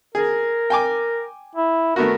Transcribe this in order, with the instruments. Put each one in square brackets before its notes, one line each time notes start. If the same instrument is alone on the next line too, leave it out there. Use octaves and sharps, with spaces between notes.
[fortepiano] G#4 [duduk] A#4
[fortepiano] G5 G#5 D6
[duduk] E4
[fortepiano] A3 B3 F#4 [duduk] A#4